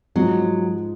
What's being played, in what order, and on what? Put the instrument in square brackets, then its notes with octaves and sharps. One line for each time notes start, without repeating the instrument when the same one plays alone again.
[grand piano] G#2 F3 G#3 [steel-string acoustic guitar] F#3